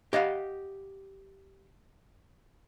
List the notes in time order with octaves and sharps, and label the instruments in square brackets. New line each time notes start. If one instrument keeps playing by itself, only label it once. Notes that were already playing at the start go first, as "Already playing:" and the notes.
[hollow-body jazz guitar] G4 D#5 F5 F#5